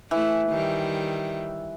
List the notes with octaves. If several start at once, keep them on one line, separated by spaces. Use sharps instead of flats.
E3 A3 E4
D#3 G3